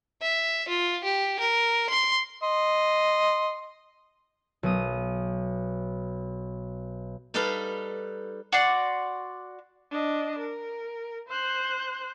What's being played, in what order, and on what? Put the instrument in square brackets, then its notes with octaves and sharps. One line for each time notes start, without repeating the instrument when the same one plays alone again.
[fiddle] E5
F4
G4
A#4
C6
[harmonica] D#5 C6
[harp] B1 D#6
[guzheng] G3 D#4 G4 A4 B4 F5
[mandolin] F#4 D5 C6
[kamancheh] D4 D#5
A#4
C5 F#6